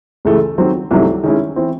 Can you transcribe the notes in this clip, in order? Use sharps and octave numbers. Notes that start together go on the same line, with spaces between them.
C#2 C#3 E3 A3
D#3 F#3 C4
C2 C3 D#3 F#3 A3
D#3 G#3 C#4 E4
E3 C4